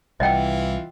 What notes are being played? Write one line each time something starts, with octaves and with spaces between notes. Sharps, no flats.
C2 E3 F4 D#5 F#5 G5